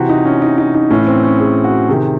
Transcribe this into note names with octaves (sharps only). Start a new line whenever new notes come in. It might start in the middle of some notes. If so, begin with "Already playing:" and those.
Already playing: C3 E3 F#4
D#4
C#4
D#4
D#4
D#4
A2 E3 C#4
C4
C#4
G#4
F#4
C3 D#3 G#4